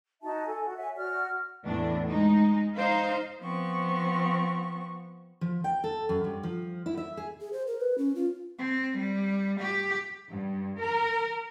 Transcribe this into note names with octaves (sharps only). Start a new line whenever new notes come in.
D#4 F#4 E5 A5
A4 G#5
F#4
C#5 E5 F#5 G#5
F#4 D5 F6
E2 A2 D4
G#3 D#4
D#4 C5 F5
F3 B3 C4 C#6
F3
G5
A4
F#2
G2
F3
E4
E5
G#4
G#4
C5
A#4
B4
C#4
F4
C4
G3
G4
G2
A#4